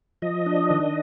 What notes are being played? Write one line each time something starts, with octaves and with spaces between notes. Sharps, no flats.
F3 D#5
D4
D#3